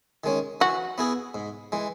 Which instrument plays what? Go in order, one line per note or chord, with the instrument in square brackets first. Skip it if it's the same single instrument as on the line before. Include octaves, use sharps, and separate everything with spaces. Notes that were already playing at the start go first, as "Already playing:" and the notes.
[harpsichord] D#3 G#3 C#4
[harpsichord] E3 [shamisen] F#4
[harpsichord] B3 E4 G#4
G#2
E3 G#3